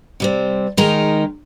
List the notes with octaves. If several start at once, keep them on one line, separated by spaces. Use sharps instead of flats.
C3 G3 C4
D#3 G#3 D#4 A#4